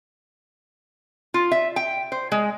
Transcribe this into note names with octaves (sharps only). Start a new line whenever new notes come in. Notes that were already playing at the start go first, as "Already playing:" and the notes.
F4
E5
G5
C5
G#3